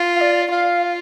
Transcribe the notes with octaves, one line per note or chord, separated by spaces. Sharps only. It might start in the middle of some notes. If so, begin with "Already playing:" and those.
Already playing: F4
F5
D5
F4 F5